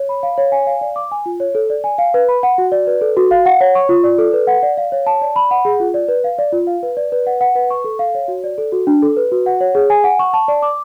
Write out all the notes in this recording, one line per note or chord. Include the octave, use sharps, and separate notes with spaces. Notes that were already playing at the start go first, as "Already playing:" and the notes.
Already playing: C#5
B5
F5
C#5
G#5
F5
D5
D6
G#5
F4
C#5
A4
D5
G#5
F5
B4
B5
F#5
F#4
D5
B4
A4
F#4
F5
F#5
C#5
C#6
F4
D5
A4
B4
F#5
D5
F5
C#5
A5
D5
B5
F#5
G#4
F4
D5
B4
F5
D5
F4
F5
B4
D5
B4
F#5
F#5
B4
C#6
A4
F5
C#5
F#4
D5
A4
F#4
D4
A4
B4
F#4
F#5
C#5
G#4
G#5
F#5
C#6
A5
D5
D6